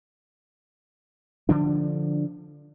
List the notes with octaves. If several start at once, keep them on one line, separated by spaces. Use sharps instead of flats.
D3 F3 D4